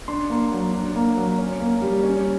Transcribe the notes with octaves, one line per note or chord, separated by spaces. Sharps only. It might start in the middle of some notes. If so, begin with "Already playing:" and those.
D4 C6
A#3
F#3
D4
A#3
F#3
C#4
A#3
G3
C#4